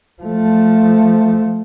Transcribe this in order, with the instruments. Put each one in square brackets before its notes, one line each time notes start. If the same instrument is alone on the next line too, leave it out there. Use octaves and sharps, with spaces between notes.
[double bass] F3 A3